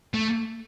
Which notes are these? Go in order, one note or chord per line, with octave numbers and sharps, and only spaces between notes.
A3